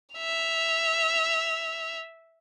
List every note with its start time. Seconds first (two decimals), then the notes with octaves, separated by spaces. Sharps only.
0.15 E5 F7